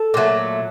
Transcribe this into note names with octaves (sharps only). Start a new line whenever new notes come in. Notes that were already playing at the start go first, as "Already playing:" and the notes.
Already playing: A4
A#2 F#3 A3